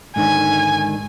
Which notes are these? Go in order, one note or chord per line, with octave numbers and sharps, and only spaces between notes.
G#2 D3 D#3 G#5